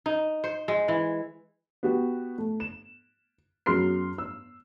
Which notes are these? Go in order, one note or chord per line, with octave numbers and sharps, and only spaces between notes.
D#4
C5
G#3
E3
B3 F#4 G4
A3
E7
F#2 F#3 G#4 C6 F6 C7
E6